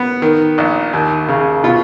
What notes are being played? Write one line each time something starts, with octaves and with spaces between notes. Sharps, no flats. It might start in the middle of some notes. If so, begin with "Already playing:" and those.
Already playing: B3
D#3
A#1
D#2
C#3
B2 F4